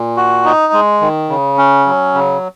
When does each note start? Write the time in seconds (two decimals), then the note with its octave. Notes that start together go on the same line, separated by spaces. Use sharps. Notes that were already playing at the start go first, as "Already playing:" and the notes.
Already playing: A#2
0.17 F#4
0.45 D#4
0.73 G#3
1.01 D#3
1.29 C#3
1.58 C#4
1.86 F#3
2.14 C#3